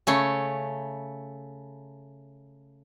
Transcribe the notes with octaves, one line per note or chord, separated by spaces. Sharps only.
C#3 A3 C#5